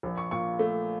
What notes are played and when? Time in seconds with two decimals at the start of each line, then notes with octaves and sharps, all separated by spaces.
0.03 A#1
0.17 C#6
0.31 A#2 C#6
0.59 A3